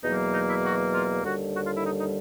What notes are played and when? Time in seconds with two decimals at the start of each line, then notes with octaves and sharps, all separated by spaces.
0.03 E2 B2 F#3 A#3 D#4
0.33 D#4
0.49 E4
0.63 F#4
0.93 F4
1.23 D#2 D3 G3 F#4
1.54 F#4
1.65 F4
1.75 E4
1.84 D#4
1.99 D#4